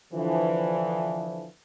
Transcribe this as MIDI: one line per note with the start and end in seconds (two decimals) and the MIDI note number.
0.13 1.47 50
0.13 1.47 52
0.13 1.47 53